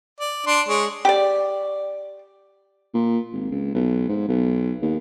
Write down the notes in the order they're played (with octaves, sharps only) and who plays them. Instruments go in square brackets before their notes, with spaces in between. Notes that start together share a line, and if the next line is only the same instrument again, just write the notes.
[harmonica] D5
D4 C6
G#3 C#5
[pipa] G4 D5
[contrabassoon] A#2
G#1
C#2
B1
G#2
B1
D#2